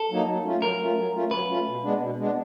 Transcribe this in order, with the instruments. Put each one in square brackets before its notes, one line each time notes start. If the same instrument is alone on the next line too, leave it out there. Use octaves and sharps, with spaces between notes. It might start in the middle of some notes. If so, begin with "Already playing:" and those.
Already playing: [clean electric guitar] A4
[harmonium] F#3 A#3 D#4
F#3
A3 C#4 F4
[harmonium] F#3 [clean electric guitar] A#4
[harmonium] A3 C#4 F4
F#3
A3 C#4 F4
[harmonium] F#3 [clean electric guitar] B4
[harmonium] A3 C#4 F4
B2
G#3 B3 D4
B2
G#3 B3 D4